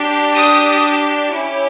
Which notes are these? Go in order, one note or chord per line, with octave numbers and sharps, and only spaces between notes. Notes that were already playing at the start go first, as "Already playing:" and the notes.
Already playing: D4 G4
D#6
C#4 E4 G4